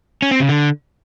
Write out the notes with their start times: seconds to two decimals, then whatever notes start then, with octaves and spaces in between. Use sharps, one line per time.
0.22 C#4
0.31 C4
0.40 C#3
0.49 D3